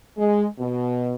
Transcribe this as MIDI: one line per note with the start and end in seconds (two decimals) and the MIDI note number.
0.18 0.45 56
0.59 1.14 47